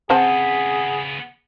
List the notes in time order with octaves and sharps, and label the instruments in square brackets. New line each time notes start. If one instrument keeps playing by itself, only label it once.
[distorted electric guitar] C#3 B3 [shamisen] C4 C5 A5 [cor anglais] G#4 [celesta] F#5